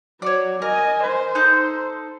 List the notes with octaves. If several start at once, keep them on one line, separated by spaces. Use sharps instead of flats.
F#3 C#5 D5
A#4 D#5 G#5
C5
D#4 A4 G6